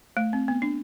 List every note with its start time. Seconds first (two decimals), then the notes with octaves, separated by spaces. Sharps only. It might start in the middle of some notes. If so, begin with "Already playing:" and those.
0.17 A3
0.33 C4
0.48 B3
0.62 D4